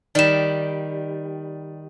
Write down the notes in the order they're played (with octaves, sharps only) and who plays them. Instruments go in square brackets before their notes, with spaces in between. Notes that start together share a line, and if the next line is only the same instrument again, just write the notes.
[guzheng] D#3 G3 [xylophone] D5 E7